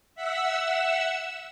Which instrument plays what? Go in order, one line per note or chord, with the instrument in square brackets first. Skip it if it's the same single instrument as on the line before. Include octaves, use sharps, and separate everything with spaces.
[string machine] E5 F#5 E6